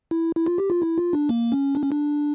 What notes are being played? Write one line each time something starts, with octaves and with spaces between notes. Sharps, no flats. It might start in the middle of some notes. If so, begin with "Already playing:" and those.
E4
E4
F4
G4
F4
E4
F4
D4
A#3
C#4
D4
C#4
D4